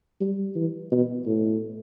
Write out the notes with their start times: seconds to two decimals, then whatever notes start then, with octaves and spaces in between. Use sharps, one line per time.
0.21 G3
0.55 E3
0.92 B2
1.26 A2